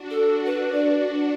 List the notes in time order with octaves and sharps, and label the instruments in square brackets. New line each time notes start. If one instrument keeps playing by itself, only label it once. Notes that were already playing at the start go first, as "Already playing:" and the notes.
Already playing: [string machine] D4 F#4
[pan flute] A4
B4
D5